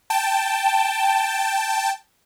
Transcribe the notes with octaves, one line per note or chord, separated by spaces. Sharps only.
G5 A5